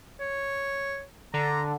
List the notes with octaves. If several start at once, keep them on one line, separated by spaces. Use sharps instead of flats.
C#5
D3 A#5